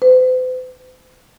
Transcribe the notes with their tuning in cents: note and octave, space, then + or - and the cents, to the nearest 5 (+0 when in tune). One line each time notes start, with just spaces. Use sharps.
C5 -45